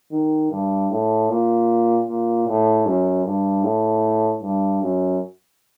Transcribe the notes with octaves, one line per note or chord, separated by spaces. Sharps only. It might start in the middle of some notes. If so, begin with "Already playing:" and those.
D#3
G2
A2
A#2
A#2
A2
F#2
G2
A2
G2
F#2